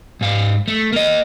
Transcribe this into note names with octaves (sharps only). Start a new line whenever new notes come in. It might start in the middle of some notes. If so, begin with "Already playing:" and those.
G#2 F5
A3
A#3 D#5